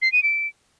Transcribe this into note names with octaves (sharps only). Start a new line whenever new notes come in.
C7
D#7
D7